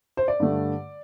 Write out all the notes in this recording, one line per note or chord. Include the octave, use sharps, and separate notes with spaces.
C5
D5
G2 D3 A3